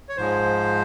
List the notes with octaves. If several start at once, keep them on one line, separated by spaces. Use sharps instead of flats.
C#5
G#2 F3 G#3 C5